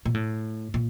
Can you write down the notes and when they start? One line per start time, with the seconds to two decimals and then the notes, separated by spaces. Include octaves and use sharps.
0.05 A#2
0.14 A2
0.74 A#2